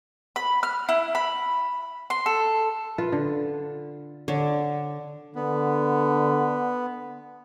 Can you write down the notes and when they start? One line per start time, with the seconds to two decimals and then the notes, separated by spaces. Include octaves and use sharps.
0.36 B5
0.63 F6
0.89 E4
1.15 B5
2.10 C6
2.26 A4
2.98 F4 B4
3.12 D3
4.28 D3 C#5
5.35 D3 B3